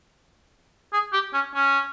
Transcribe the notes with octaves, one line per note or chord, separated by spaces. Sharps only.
G#4
G4
C#4
C#4